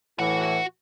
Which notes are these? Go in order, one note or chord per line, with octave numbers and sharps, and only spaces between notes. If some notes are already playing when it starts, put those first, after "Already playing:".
A2 E3 F#4 F#5